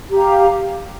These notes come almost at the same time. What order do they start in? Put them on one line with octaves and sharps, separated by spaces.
G4 A#5 F5